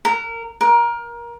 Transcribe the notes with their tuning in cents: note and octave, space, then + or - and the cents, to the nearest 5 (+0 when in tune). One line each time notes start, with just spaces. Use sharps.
A#4 -20
A#4 +20